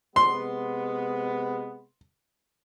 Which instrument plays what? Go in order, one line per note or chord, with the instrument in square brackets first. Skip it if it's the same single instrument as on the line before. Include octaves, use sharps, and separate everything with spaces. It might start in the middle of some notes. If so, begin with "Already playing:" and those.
[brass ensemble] C3 G#3 B3 [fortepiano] C6